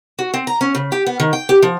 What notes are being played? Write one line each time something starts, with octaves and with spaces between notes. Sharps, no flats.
F#4
C4
A#5
C#4
C#3
G4
B3
D#3
G5
G4
F3